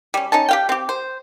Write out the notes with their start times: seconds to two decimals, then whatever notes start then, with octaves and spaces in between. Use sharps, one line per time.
0.14 G3 C#4
0.32 C#4 D#4 A5
0.49 G4 F5 G5
0.69 C4 G4
0.89 C5